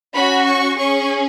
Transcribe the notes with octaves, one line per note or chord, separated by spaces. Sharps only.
C#4 F#4 B5
C#6
C#4 G#4 C#6